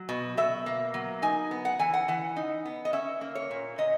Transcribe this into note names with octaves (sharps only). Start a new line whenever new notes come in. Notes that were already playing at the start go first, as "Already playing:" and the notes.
Already playing: F#3
B2
B2 E5
A#3
F#3
D#4 G#5
B3
F#5
E3 G#5
F#5
E3 F#5
D#4
B3
D#5
C#4 E5
A#3
C#5
A#2
A#2 D#5